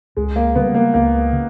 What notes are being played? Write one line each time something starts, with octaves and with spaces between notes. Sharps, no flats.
C#2 G#3
A#3
C#3 G3 B3
A#3
C#2 A#3
C#3